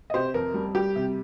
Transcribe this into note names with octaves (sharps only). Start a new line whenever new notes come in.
D#5
C3 G4 C5
F2 A#4
G3
G3 G4
C3